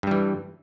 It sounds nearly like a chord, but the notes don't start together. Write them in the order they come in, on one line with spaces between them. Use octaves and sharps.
G2 G3 E3